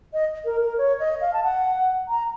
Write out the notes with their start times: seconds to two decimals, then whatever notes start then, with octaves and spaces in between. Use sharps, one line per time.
0.13 D#5
0.45 A#4
0.62 A#4
0.78 C#5
1.00 D#5
1.21 F5
1.33 A5
1.44 F#5
2.08 A#5